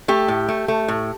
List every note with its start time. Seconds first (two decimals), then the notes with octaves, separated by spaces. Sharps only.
0.08 A3 G4
0.28 A2
0.48 A3
0.68 A3
0.88 A2